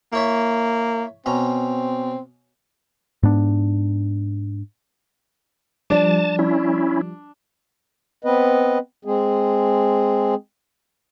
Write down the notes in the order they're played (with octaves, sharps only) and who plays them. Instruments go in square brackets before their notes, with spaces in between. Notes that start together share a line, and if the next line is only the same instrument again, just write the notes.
[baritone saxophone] A#3 [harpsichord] E4 C#5 E5
[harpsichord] B2 C#4 A#5 [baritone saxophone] C4
[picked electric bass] G#2 B3 D4
[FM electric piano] F3 G3 [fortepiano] D4 [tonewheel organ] A5
[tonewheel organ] C#4 E4
[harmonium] B3 C4 B4 D#5
G#3 C4 G#4